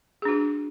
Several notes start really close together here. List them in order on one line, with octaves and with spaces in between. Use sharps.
G#4 D4 F#4